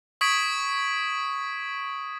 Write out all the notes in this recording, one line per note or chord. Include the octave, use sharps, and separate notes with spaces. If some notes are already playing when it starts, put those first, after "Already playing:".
C#6 D#6 G#6 B6 D7